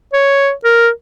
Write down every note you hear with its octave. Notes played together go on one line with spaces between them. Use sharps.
C#5
A#4